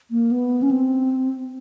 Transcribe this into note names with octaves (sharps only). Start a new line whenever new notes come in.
A#3
B3
C#4
C4